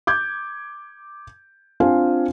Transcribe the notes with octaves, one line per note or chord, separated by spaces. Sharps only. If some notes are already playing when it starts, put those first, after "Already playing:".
D6 G6 G#6
C4 D4 F4 F5 G#5